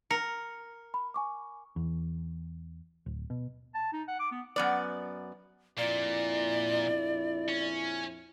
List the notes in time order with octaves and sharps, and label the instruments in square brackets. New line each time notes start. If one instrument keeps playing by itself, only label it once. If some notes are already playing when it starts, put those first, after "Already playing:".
[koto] A#4 [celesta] C#7
[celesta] B5
G#5 C#6 D6
[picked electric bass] E2
D1
B2
[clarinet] A5
D#4
F#5
D6
B3
[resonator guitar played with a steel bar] F#2 B3 D5
[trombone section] A#1 F2 E4 [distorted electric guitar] A#2 [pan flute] D5
[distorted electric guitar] C#4